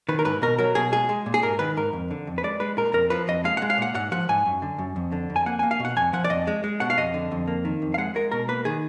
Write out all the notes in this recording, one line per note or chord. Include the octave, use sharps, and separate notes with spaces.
D#3 B4
A#4
G#2 B4
B2 A#4
F#3 A#4
B2 G#4
G#3 G#4
G#3
A#2
G#4
G#2 A#4
D#3 B4
G#2 A#4
F2
D3
F2
B4
G#3 D5
G#3 B4
A#2 A#4
F2 A#4
F3 B4
F2 D#5
G#3 F5
F#5
G#3
F5
A#2 F#5
G#2 F#5
F3 F#5
G#2 G#5
F#2
D3
F#2
F2
D3
F2
G#5
A#3 F#5
A#3 G#5
F5
B2
F#5
F2 G#5
F3 F#5
D5
F2 D#5
G#3
G#3
B2 F#5
F5
F2 D#5
D3
F2
A#3
D#3
F2
F5
G#3 F#5
G#3 A#4
B2 A#4
A#3 B4
D#3 G#4